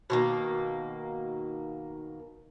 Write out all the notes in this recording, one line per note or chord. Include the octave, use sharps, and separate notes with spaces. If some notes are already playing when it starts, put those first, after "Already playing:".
B2 D#3 A#3